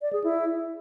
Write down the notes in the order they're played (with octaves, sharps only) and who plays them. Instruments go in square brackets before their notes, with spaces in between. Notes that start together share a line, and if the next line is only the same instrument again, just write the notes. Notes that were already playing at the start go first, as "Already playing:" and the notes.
[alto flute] D5
G#4
E4